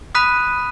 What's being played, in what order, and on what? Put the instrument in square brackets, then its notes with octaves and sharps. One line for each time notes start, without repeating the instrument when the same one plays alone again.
[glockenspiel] B5 D#6 F#6 B6 D#7